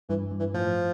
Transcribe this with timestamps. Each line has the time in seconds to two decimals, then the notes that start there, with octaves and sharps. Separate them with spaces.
0.09 G2 E3
0.31 G2
0.40 E3
0.54 A2 F3